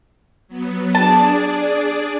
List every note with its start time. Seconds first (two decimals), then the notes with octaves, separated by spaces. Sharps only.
0.48 F#3 B3
0.95 D4 G#4 D5 A5